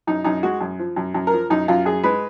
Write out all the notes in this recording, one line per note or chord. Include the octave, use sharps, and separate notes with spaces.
F#2 D#4
F#2 D#4
G#3 F#4
F#2
F3
F#2
F#2
A#4
F3
F#2 D#4
F#2 F4
F#2 G#4
G#3 B4